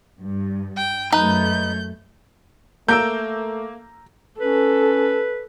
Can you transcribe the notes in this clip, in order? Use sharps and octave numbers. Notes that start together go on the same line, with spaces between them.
G2
G5
F#2 A3 D#4 B4 G6
A3 A#3 A#5 E6 G6 D7
C#4 A4 B4